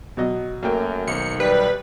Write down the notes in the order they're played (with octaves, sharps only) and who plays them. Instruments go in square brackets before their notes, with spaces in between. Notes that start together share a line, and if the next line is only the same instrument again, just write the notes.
[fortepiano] B2 F#3 D#5
[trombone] F#2 [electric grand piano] A3 F#4 G5 [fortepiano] A#3 A#4
[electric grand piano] B1 D#3 C5 [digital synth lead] C#7
[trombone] G3 [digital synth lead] B4